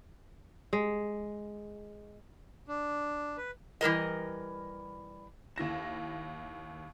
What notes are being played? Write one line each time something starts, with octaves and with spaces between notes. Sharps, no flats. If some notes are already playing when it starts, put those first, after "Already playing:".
G#3
D4
B4
E3 G3 A#4 D#5
D#2 E4 A#6 E7